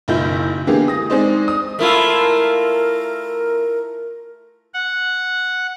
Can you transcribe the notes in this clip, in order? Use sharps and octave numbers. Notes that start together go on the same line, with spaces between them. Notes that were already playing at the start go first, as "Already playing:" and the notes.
F#1 B1 E4 F4 G6
D3 E3 A#3 B3 G4 G#4
D#6 A#6
G#3 C4 D#4 C5 D5 D#5
D#6
A3 E4 F4 A#4
F#5